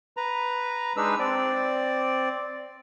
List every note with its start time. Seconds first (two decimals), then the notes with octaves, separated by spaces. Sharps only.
0.17 B4 A#5
0.97 G#3 D4 D#4 B4 E6
1.19 C4 D5